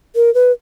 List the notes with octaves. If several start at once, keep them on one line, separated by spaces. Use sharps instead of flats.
A#4
B4